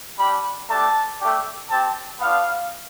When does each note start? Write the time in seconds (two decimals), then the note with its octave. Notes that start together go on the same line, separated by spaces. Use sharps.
0.18 G3 D4 G4 B5
0.69 A3 D4 G4 A5
1.20 A3 D4 G4
1.70 C4 G4 A5
2.20 B3 D4 F4 F5